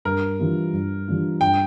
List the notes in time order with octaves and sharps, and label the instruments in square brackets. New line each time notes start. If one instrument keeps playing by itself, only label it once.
[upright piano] G2 [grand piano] A#4
[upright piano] E3 G3 D4 F4
G2
E3 G3 D4 F4
[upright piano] G2 [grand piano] G5